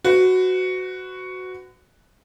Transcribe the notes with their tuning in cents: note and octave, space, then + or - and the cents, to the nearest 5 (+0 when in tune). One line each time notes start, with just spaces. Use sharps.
F#4 +0 B4 +40